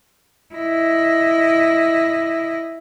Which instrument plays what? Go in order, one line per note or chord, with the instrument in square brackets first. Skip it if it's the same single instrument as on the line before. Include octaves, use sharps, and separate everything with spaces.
[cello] E4 D#5